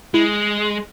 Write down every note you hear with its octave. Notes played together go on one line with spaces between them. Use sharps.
G#3 E4